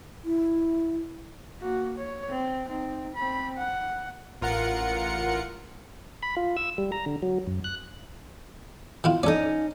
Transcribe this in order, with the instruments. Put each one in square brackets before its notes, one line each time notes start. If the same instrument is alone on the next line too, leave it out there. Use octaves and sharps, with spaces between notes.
[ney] E4
[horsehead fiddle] A#3 F#4
C#5
C4
C4 D#4
C4 B5
F#5
[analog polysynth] A1 F4 A#4 F#5 C#7
[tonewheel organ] B5
F4
E6
G3
A#5
D3
F#3
F#2
F#6
[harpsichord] D#3 E4 F4
[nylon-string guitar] C#4 D#4 [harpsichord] A4 D5